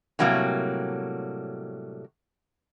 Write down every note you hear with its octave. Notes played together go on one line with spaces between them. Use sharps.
A2 C3 F#3 G3 A#3